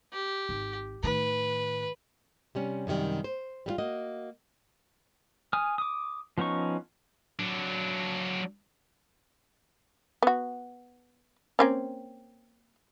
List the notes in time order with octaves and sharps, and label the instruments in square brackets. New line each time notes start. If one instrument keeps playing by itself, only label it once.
[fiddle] G4
[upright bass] G#1
[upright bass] A2 D#3 [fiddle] B4
[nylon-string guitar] C3 G3 C#4
F#2 C3 D#3 G3
C5
G3 B3 F4
A#3 F#4 D#5
[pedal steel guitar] G#5 D#6 F6
D6 D#6
F3 B3 C#4 D#4 C#6
[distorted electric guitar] F#3 D4
[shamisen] B3 F#4
A#3 C4 C#4